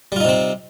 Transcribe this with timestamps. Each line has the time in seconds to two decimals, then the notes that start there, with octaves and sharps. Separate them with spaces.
0.12 G3
0.16 F4
0.20 D#4
0.25 C3
0.29 C4